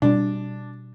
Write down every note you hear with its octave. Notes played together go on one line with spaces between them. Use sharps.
B2 G3 D4